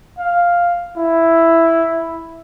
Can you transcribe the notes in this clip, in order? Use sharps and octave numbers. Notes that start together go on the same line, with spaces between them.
F5
E4